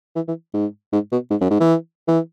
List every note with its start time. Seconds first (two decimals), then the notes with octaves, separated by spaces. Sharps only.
0.15 E3
0.28 E3
0.54 G#2
0.93 G#2
1.12 B2
1.30 G#2
1.41 F#2
1.50 G#2
1.60 E3
2.08 E3